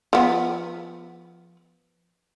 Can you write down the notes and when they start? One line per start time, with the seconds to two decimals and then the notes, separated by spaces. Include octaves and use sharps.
0.13 F3 B3